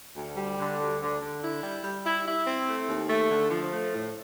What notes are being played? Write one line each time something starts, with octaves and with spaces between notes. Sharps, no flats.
D2
G3
D3
D2
D3
D3
E4
G3
G3
E4
E4
C4
A3
D#2
A3
D3
F3
A3
A2